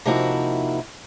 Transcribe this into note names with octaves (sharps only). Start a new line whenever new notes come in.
C3 F3 A#3 D#4 E4 F#4